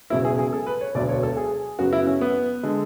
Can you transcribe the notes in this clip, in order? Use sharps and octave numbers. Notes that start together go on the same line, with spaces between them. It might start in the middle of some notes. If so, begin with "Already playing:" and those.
E1 E2 C#3 F#3 E4
G#4
G#4
A4
B4
C#5
E1 D2 D3 F#3 B3 D5
C#5
A4
G#4
F#2 C#3 F#3 B3 F#4
E4
C#4
B3
D3 G#3